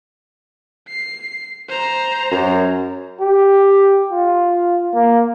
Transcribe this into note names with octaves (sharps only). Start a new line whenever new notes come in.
C7
C5 A#5
F#2
G4
F4
A#3